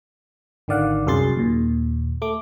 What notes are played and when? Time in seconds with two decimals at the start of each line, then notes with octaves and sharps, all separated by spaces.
0.68 G#1 D3 D#3 D5 F5 F#5
1.07 C2 F#2 G#4 C6 A6
1.36 D#2 A#2
2.22 A3 D6